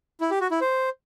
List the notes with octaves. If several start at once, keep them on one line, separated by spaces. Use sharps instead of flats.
E4
G4
F#4
E4
C5